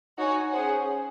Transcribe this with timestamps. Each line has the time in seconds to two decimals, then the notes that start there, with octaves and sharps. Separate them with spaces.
0.18 D#4 F#4 C#5 G#5
0.52 C#4 G#4 C5 F#5